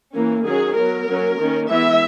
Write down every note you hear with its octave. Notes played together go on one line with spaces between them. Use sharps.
E3 A#3 C#4
D#3 F#3 C#4 G#4
F#3 B3 A#4
F#3 A#3 C#4
D#3 A#3 C#4
E3 G#3 B3 E5